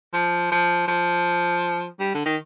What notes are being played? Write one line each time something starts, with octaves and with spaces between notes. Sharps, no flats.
F3
F3
F3
G3
D3
D#3